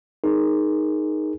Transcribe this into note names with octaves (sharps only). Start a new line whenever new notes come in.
D#4 G#4 A#4